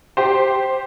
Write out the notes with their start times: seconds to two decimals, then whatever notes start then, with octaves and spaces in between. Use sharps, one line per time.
0.17 G4 C5